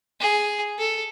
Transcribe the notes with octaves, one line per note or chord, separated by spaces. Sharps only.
G#4
A4